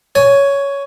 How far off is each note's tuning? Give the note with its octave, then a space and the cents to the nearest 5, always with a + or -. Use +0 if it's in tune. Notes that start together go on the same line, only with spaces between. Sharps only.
C#5 +10 G#5 +5